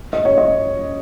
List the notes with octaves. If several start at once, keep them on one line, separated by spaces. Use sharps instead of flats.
D#5
C#5
D#5